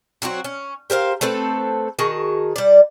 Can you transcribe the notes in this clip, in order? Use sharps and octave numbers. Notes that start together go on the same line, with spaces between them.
F#3 C4 F4 F#4
C#4
G4 A#4 C5 F5
A3 C4 A4 B4
D#3 F#4 G#4 A5
G3 D5